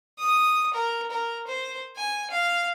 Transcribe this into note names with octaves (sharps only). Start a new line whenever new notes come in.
D#6
A#4
A#4
C5
G#5
F5